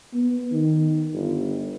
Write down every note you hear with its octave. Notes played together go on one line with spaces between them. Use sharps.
B3
D#3
G1